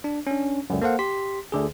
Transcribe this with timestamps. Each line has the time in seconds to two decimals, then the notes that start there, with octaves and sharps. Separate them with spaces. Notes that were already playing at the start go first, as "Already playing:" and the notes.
0.04 D4
0.27 C#4 D4
0.70 C#2 F#2
0.82 A#3 A4 C5 F5 F#5
0.99 G4 C6 B6
1.52 D2 D3 G#4